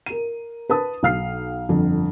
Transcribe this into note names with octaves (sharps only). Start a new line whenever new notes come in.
A#4 D#7
B4 A5 D#6
B1 F5 F6 C7
G1 F2